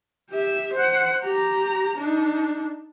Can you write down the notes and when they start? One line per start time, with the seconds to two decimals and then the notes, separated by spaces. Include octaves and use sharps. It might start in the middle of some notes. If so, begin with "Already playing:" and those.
0.30 G4 E5
0.73 C5 F#5
1.24 G4 A#5
1.98 D4 D#4